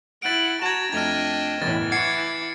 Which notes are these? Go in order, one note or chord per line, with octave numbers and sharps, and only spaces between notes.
E4 F#5 A6 D7
F#4 A5 A#5 G#6 E7
F2 A3 D4 D#5 G5 F6 G#6
F#1 E2 A2 E3 A6
E4 F#5 C#6 D6 G#6 C7 C#7